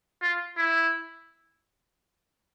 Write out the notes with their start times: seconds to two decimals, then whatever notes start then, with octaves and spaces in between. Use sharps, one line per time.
0.22 F4
0.57 E4